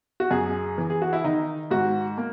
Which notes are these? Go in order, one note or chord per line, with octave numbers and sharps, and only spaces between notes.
F#4
F#2 G#4
E3
G#4
F#4
E4
D#3 D#4
G#2 F#4
A#3